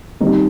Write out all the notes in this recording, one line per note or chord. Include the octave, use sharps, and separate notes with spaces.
D#3 G3 C4 D#4